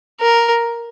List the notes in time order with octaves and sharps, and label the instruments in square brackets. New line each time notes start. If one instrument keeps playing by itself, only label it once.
[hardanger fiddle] A#4